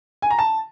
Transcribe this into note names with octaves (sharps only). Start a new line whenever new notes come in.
G#5
A#5
A5